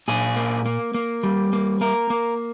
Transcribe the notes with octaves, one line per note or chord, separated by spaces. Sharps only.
A#2 G#4
A#3
A#3
A#3
G3
A#3
A#3 A#4
A#3